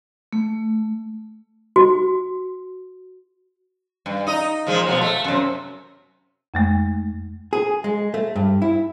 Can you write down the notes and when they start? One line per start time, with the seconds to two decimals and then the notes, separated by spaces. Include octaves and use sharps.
0.33 A3
1.76 F#4
4.06 G2
4.27 D#4 D#5
4.67 A#2 F3 G#3
4.87 B2 F3 F#3
5.01 A3
5.24 F#2 C3
6.54 F2 G#3 A3
7.53 G#4
7.84 G#3
8.14 A3
8.36 G2
8.62 E4